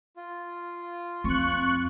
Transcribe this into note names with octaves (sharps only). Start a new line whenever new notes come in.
F4
F2 C4 C#6 F#6